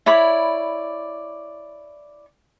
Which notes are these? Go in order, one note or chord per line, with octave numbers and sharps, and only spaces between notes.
E4 C#5 D5 B5